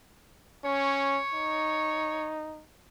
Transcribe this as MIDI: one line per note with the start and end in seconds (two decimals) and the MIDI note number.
0.65 1.19 61
0.65 2.28 73
1.34 2.64 63